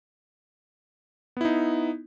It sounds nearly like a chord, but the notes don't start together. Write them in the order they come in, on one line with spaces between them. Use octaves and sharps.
B3 E4 D#4